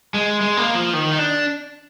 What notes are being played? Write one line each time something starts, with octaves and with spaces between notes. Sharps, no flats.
G#3
G#3
A#3
F3
D#3
D#4
D4